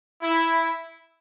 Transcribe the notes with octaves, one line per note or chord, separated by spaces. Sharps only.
E4